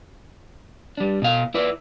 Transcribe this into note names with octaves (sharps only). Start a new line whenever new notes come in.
G3 D4
B2 F5
E4 B4 D5